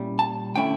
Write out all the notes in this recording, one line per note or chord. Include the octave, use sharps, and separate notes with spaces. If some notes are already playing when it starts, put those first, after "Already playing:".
Already playing: A#2 G3 C#4 E4
A5
D3 A3 C#4 E4 G5